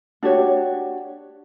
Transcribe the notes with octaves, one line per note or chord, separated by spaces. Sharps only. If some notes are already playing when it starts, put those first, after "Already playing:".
D4 F#4 G4 C#5